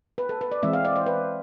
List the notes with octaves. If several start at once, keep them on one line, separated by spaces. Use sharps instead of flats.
B4
A4
B4
D5
E3 G#3 C4 E5
F5
D5
C5
B4